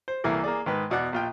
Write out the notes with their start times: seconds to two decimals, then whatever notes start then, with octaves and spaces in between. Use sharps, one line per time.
0.08 C5
0.24 C2 E3 A#3 E4 A4
0.44 A#3 G#4 D5
0.66 G#2 D#3 B4
0.90 E2 B2 D5 F#5 F#6
1.12 A#1 F4 G5